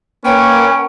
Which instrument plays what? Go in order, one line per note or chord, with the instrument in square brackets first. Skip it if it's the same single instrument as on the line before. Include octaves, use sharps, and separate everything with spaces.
[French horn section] A#3 [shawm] C#4 [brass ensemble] A#4 B4 C#5 [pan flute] G5